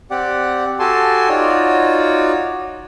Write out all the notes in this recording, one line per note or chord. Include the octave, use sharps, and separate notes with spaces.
C4 G4 D5 F#5
F#4 G4 A4 G#5 A5 C6
D#4 F4 F#4 C#5 D5